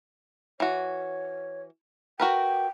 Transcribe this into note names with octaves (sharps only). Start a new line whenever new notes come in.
E3 F#4 C#5
F#4 A#4 B4 G5